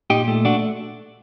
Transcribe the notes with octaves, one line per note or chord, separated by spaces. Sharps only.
A#2 D#4 G4
A3
D4 F#4